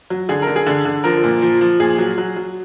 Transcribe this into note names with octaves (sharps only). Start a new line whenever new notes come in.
F#3
D3 G#4
D3 A#4
G#4
D3
D3
F3 A#4
A#2
F3
F3
A#2 G#4
F#3
F#3
F#3